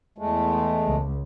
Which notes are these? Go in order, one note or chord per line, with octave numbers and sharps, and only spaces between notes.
E2 G#3 A3
C#2